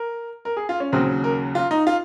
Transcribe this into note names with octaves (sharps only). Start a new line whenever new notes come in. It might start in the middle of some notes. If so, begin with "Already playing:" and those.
Already playing: A#4
A#4
G#4
F4
C#4
D#2 C#3 F#3 C4
A#4
F4
D#4
F4